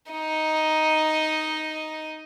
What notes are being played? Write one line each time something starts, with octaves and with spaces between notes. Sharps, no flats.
D#4 D#5